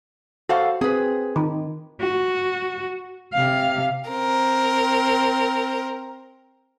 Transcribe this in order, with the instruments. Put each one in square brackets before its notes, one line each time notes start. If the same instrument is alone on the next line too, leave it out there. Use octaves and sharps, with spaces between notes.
[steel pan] F#4 [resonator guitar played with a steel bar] A4 C5 F5
[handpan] C4 [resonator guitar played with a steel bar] G#4 B4
[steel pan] D#3
[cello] F#4
C3 F5
[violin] C4 A#4